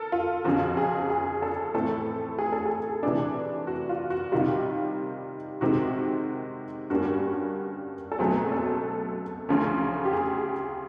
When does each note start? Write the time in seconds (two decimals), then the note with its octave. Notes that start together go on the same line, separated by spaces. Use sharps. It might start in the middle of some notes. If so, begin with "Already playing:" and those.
Already playing: A4 A#4
0.12 F4
0.44 F2 C#3 F3 F#4
0.77 G#4
1.10 G#4
1.42 A4
1.74 A2 E3 A3 C4 A4
2.39 G#4
2.52 A4
2.65 G#4
3.03 C3 E3 A3 D4
3.67 F#4
3.89 F4
4.10 F#4
4.32 C3 D#3 G3 F4
5.61 C3 D#3 G#3 C4 F#4
6.90 G2 D3 G3 A#3 C#4 F#4
8.12 A4
8.19 C#2 B2 F#3 A3 C4 G#4
8.52 A4
9.49 D2 C#3 F3 A3 C#4
10.05 G4
10.13 G#4